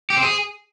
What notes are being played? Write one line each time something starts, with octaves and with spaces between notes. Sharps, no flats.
G4
C4
G#4